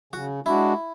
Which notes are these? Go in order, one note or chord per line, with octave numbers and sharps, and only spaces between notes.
C#3 F#4
G#3 D4 E4 F#4